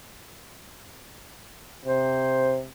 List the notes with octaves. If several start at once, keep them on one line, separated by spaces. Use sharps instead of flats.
C3 C5